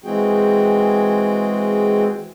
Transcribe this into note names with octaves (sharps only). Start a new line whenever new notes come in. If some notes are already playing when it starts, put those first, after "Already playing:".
E3 G#3 C4 F#4 G#4 G5